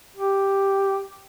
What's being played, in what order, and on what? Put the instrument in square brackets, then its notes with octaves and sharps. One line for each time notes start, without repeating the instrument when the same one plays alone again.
[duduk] G4